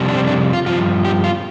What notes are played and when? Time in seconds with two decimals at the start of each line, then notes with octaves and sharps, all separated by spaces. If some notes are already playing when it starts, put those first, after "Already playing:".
Already playing: F2 C3 G3
0.09 D4
0.15 C4
0.27 D4
0.53 F4
0.66 G2 F3 F4
1.05 G4
1.24 F4